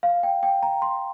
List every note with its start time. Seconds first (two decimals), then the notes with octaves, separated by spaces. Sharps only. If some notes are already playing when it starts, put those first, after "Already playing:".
0.03 F5
0.23 G5
0.43 G5
0.63 A#5
0.82 C6